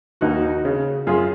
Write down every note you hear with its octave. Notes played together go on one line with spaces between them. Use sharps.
D#2 D#4 F#4
C#3
F#2 F4 G#4